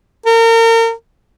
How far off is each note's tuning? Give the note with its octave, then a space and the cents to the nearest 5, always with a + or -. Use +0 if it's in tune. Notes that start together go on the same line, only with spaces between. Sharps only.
A#4 -35